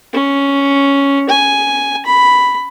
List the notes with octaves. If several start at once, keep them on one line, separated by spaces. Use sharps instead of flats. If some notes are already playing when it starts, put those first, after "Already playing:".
C#4
G#5
B5